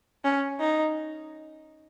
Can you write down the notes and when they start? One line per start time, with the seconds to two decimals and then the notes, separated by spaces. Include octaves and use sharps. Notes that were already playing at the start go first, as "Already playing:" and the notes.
0.24 C#4
0.60 D#4